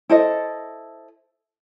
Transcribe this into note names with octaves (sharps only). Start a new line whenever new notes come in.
E4 A4 C5 D#5